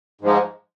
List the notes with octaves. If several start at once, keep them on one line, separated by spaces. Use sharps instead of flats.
G#2 F3 G#3